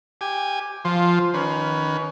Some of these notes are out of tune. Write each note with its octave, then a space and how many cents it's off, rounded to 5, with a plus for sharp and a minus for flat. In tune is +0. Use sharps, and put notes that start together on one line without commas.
G4 +0 G#5 -15
F3 +0 F4 +10
D#3 +0 C#4 +25 B4 +0